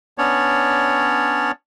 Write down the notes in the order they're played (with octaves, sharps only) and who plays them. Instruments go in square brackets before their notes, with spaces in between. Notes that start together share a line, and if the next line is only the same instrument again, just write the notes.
[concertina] B3 C#4 D4 C#5 D5